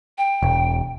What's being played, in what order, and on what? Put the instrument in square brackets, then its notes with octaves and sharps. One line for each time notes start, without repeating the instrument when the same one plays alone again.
[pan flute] G5
[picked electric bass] E1